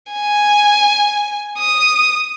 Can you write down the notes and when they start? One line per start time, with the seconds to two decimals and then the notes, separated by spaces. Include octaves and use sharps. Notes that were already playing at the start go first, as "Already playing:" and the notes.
0.12 G#5
1.58 D#6